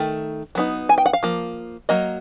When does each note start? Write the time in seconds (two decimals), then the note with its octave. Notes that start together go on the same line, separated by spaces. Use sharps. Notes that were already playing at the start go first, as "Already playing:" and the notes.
Already playing: D#3 A3
0.55 F#3 B3 D#4
0.89 G#5
0.98 G5
1.06 F#5
1.13 F5
1.23 F3 A#3
1.89 F#3 A#3 D#5